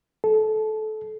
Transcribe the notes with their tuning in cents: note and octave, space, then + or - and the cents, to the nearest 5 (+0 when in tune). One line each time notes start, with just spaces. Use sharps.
A4 -20